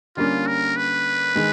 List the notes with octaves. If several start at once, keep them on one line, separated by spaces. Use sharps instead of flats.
D3 G3 A#3 C#4 F4
A#4
B4
D#3 G#3